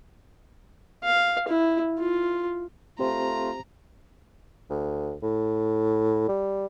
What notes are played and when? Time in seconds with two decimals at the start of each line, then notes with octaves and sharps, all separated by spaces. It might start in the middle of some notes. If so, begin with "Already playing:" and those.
1.04 F5
1.48 E4
1.98 F4
2.99 A3 C4 F4 G4 C5 A#5
4.70 D2
5.22 A2
6.28 G3